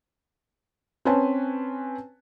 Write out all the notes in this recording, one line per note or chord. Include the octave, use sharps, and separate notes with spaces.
C4 C#4 B4 C#5 G#5 A5